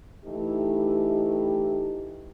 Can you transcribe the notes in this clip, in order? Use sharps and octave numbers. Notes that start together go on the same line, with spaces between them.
E3 A3 D#4 E4 G4